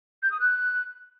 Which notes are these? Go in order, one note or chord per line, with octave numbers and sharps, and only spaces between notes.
G6
D#6
F#6